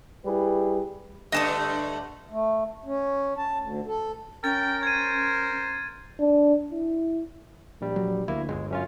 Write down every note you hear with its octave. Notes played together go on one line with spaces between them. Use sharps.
G3 E4 G#4 B4
G2 D3 A3 D#5 A5 D#6
A3
C#4
A5
D2
A4
C#4 A#4 G5 A6
C5 G#6 D#7
D4
E4
A#1 G3
F#3
D2 A#3 E4
G1 G#3
F#2 C#4 F4